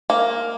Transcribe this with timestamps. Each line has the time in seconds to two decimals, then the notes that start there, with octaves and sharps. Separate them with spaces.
0.10 A#3